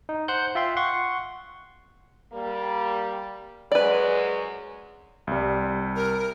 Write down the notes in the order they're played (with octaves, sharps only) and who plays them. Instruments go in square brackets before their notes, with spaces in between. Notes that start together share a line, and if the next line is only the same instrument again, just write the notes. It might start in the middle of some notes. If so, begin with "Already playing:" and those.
[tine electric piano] D#4
C5 F#5 F#6 G6
F4 E5 G5 C6
F#5 C6 C#6
[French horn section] G3 A#3
[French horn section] F#2 F#3 G#3 [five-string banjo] B4 D5
[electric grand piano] C2 G3
[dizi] A#4